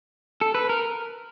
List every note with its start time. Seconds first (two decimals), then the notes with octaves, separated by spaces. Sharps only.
0.41 A4
0.55 B4
0.69 A#4